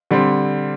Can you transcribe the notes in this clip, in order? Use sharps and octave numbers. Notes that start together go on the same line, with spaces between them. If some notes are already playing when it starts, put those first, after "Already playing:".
D3 G3 C4